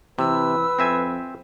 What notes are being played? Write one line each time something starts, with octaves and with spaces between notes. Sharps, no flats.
C3 E3 B4 E6
F2 C4 E5 G#5